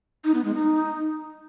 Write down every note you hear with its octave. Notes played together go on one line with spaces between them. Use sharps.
D#4
B3
G#3
D#4